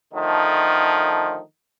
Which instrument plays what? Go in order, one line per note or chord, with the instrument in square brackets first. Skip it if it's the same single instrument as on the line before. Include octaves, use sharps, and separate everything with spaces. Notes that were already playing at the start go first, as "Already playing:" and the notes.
[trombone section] D3 D#3 F3 A3 D#4